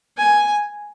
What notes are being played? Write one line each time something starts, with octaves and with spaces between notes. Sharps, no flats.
G#5